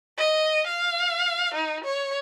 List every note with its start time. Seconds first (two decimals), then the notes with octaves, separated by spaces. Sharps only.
0.18 D#5
0.67 F5
1.54 D#4
1.84 C#5